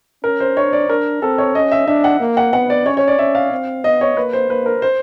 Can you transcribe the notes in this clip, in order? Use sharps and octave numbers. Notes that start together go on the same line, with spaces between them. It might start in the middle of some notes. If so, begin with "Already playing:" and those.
C#4 A#4
C5
D4 C#5
D5
D4 A#4
C4 A4
C#5
C#4 D#5
E5
D4 E5
F#5
A#3
F#5
B3 F#5
D5
C#4 C#5
C#5
D5
C#4 E5
F5
C4
B3 D#5
C#5
A#3 B4
C5
A#3 B4
A#4
C5